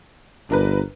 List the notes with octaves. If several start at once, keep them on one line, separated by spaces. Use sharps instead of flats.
G1 D4 A#4 B4